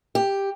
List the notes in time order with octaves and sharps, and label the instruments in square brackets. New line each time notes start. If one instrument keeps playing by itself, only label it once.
[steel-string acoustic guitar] G4